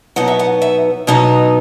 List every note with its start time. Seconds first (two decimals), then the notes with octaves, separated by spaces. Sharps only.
0.16 B2 F#3 B3 D#4 F#5
0.28 E5
0.39 F#5
0.62 E5
1.07 B2 F#3 B3 D#4 D#5